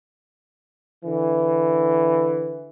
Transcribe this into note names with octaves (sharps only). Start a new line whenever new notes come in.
D3 E3